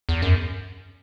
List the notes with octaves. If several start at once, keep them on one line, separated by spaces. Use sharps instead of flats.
E2
F#2